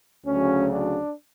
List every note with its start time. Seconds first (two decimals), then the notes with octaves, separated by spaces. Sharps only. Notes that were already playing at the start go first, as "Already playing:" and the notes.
0.26 D2 C#3 F#3 C#4
0.72 D4